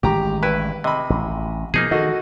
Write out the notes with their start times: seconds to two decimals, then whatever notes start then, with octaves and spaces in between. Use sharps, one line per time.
0.03 A1 D#3 G#3 G4 A#5
0.43 G2 E4 B4
0.84 C3 D#5 B5
1.10 A1
1.74 B2 F3 A#3 D#4 G#4
1.91 D#3 F#4 A4 D#5